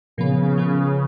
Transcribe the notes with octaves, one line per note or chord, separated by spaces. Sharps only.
A#2 C#3 F3 B3
A#2 F3 B3